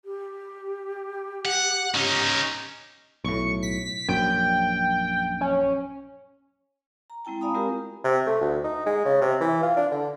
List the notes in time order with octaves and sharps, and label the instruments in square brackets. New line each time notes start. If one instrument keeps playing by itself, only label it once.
[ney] G4
[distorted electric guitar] F#5
C#4 D#4
[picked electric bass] B1 A2 [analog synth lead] C#6
[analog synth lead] B6
[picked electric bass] A#1 F#2 [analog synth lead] G5
[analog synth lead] C#4
[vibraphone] A#5
G#3 C4 E4 G5 A5
D5 F5 G#5 A#5 B5 D#6
G#3 C4 F4 G4 A#4
[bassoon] C3
A3
D2
D#4
G#3
C#3
C3
E3
F4
D4
D3